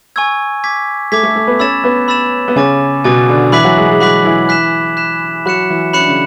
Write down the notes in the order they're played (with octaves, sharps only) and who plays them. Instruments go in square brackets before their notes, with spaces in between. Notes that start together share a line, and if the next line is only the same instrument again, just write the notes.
[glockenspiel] G#5 C#6 E6 G#6
D6 G#6 B6
[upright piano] A3 A4 [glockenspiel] D6 G#6 B6
[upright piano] A3 A4
A3 A4
B3 B4
[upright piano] C#4 C#5 [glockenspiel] B5 E6 A6 E7
[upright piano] B3 B4
[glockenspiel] B5 E6 A6 E7
[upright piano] B3
[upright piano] C#3 C#4 [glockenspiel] G#5 D6 A6
[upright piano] B2 B3 [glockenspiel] G#5 D6 A6
[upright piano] D3 D4
[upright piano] E3 E4 [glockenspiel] B5 D6 F#6 B6 F#7
[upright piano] F#3 F#4
G#3 G#4
G#3 G#4
[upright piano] F#3 F#4 [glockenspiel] B5 D6 F#6 B6 F#7
[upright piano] E3 E4
[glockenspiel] F#6 B6 E7
F#6 B6 E7
[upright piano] F#3 F#4 [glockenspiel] B5 F#6 C#7 E7
[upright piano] E3 E4
[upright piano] C#4 [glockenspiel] B5 F#6 C#7 E7
[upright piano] D4
C#3 C#4